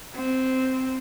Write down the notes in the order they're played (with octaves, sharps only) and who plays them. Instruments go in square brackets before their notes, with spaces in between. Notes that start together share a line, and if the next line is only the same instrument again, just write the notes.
[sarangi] C4